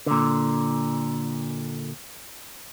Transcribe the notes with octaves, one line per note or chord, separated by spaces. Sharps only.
A#2 D3